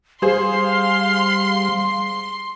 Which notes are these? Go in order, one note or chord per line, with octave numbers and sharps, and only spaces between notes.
G3 G#4 C5 F5 C6